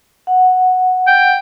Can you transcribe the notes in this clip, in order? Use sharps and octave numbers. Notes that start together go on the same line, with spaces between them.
F#5
G5